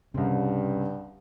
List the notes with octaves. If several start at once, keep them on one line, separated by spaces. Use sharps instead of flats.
C2 G2 C#3 C4